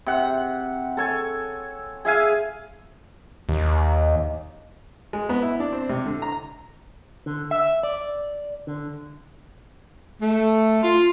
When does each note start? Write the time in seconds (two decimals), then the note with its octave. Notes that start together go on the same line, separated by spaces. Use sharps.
0.06 C3 F#5
0.97 A4 C#5 G#5
2.05 G#4 E5 F5 G#5
3.49 D#2
5.13 G#3
5.29 B3
5.42 E4
5.60 D4
5.72 C4
5.89 C3
6.06 D3
6.22 A#5
7.26 D3
7.51 E5
7.83 D5
8.67 D3
10.21 A3
10.82 F4